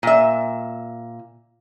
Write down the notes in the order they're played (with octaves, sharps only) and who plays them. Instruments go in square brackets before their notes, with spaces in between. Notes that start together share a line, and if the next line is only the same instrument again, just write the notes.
[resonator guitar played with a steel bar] A#2 E5